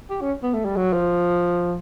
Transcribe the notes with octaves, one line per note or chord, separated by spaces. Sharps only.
G4
C#4
B3
A3
G3
F#3
F3